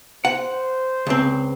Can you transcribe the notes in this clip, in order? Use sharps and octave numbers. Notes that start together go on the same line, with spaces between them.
C5 F#5
C#2 C4